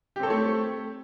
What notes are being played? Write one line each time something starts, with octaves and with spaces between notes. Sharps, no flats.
A3 C4 G4 A4 C#5